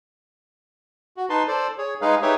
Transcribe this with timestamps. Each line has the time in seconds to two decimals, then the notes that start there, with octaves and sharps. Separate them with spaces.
1.17 F#4
1.29 D#4 B4 A5 C6
1.48 A4 C5 D5
1.78 G#4 C#5
2.02 G#3 D#4 G#4 B4 F5
2.22 D#4 G4 G#4 B4 C#5 E5